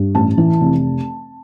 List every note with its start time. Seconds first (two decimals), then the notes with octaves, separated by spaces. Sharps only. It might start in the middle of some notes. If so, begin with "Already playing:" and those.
Already playing: G2
0.15 A1 A5
0.38 E3
0.61 F1